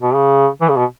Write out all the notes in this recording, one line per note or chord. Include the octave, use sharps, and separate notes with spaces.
B2
C#3
E3
C#3
B2